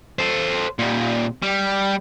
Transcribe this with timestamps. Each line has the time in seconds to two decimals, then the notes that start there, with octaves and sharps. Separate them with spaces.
0.19 A4 C5
0.79 A#2 G3
1.42 G3